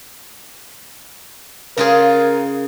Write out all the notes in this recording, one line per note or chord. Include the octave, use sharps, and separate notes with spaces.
C#3 F4 G#4 A#4